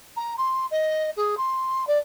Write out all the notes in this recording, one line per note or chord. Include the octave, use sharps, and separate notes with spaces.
A#5
C6
D#5
G#4
C6
D5